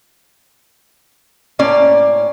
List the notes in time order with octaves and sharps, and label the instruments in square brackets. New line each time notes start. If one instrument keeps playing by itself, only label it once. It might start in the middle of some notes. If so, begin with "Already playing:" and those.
[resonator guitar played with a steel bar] A2 A#3 C#4 D5